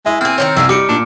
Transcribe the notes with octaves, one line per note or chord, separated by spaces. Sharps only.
G#3 E4
A#3 C4 G#4 F6
D#3 F3 C#5
C2 E4 G#4 G#5
G3 D#4 D6 C#7 D7
A#2 D4